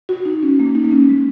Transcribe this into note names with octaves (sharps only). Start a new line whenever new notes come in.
F#4
D#4
C#4
A#3
D#4
A#3
C#4
G#3